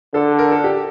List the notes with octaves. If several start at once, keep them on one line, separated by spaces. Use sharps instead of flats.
D3 A4
A#4
A4
G4